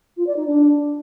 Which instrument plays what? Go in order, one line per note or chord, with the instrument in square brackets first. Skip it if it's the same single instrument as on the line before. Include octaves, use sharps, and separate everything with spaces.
[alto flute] F4
D5
D#4
D4